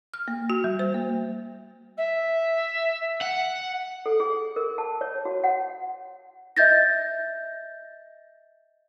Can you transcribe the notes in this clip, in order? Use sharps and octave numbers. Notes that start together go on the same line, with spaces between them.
F6
A#3
F#4
G3
C5
A#3
E5
F#5
A4
G#4
A#4
A5
C#5
F#4
F#5
D#5 E5 G6 A6 A#6